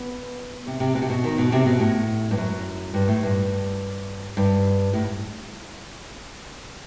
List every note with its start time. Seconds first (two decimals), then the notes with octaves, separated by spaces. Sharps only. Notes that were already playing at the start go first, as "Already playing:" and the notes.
Already playing: B3
0.67 C3
0.80 C3
0.95 B2
1.02 C3
1.10 B2
1.24 D#3
1.38 B2
1.52 C3
1.66 B2
1.80 A2
2.31 G2
2.37 F#2
2.94 G2
3.08 A2
3.23 G2
4.37 G2
4.94 A2